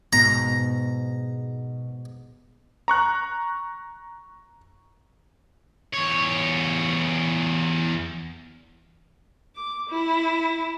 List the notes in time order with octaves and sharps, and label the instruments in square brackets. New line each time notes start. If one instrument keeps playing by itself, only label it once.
[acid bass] G#2 [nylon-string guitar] B2 [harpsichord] A#5
[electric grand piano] A#5 C#6 F#6
[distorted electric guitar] E2 C#5
[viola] D6
E4